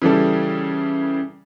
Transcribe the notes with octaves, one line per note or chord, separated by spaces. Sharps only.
C#3 E3 G3 A4